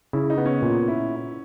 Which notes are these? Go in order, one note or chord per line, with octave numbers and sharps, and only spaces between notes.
C#3 E4
D#4
B3
C#4
A#2
E4